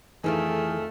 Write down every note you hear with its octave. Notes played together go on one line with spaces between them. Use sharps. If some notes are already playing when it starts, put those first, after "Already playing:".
F2 D#3 E3 A3 D#4 G#4